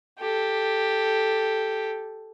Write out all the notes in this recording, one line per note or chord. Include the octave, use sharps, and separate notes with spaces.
G4 A4